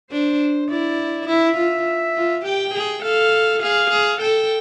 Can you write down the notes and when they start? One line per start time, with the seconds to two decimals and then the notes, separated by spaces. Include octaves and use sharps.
0.11 D4 C5
0.70 E4 D5
1.28 E4 E5
1.58 F4
2.16 F4
2.45 G4 G5
2.74 G#4
3.03 A4 F5
3.61 G#4 F5
3.91 G#4
4.20 A4 G5